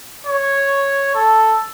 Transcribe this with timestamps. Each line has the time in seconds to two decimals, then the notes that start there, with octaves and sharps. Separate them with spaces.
0.27 C#5
1.15 A4